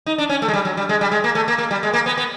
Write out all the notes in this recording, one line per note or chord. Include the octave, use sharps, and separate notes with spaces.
D#4
D4
C#4
A3
G#3
G3
F#3
G3
G#3
G3
G#3
A#3
A3
A#3
A#3
G3
G#3
A#3
B3
B3